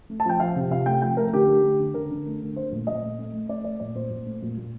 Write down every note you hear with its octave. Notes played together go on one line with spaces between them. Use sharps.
A3
A5
F3 G5
F3 F5
C3
C3 F5
A3 G5
F3 G5
A3 A#4
D3 G4
A3
D3
D3
D3 A#4
D3
A3
D3
A3 C5
A#2
A#2 D#5
A3
A3
A3
A3 D5
A3 D5
A#2 D5
A#2 C5
A#2
A3
A#2
A#2